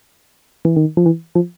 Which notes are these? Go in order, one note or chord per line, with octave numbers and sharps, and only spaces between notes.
E3
D#3
F3
E3
F3